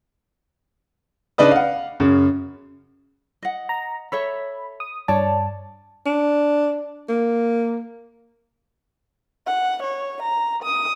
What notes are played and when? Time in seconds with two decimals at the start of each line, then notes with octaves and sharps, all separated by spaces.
1.38 C#3 D4 D#4 B4 D#6
1.52 F5 F#5
2.00 F#2 C#3
3.43 D#5 F#5
3.69 A#5
4.12 A4 C#5 E5 B5
4.80 D#6
5.08 G2 C#5 D5 A5
6.06 D4
7.09 A#3
9.47 F#5
9.83 C#5
10.22 A#5
10.63 D#6